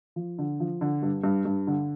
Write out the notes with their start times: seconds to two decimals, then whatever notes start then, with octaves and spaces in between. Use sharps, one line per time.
0.16 F3
0.39 D3
0.60 F3
0.81 D3
1.03 G2
1.24 G2
1.45 G2
1.67 D3